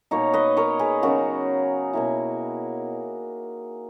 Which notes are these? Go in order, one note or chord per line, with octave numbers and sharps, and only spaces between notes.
B2 A#3 D#4 A#4 C#5
B4 D#5
A#4 C#5
G#4 B4
C#3 F#3 B3 D#4 F#4 A#4
B2 A#3 E4